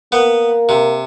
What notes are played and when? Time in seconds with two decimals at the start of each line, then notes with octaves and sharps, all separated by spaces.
0.12 A#3 B3
0.69 C3